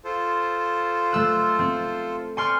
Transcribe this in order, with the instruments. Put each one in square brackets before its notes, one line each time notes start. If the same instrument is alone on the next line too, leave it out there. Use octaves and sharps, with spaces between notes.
[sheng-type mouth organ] F4 A4 C5
[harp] A3 E6 F#6
C4
[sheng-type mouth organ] D5 G5 C#6 [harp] G#5 C6 F6